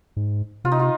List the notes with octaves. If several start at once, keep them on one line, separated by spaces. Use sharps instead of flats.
G#2
C3 F4
D#4
F4